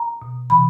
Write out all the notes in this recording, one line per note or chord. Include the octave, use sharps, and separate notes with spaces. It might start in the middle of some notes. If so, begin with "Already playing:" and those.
Already playing: A#5
B2
C3 E3 B5